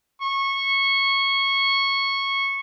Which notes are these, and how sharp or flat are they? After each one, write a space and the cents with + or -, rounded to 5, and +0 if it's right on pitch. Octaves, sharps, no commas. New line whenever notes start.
C#6 -15